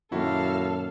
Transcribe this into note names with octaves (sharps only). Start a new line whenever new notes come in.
F#2 A#2 D#3 E4 F#4 A4 F5